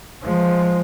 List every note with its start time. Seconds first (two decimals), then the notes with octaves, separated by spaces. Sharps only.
0.22 F3 G#3